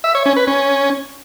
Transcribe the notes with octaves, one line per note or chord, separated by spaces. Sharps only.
E5
C#5
C#4
B4
C#4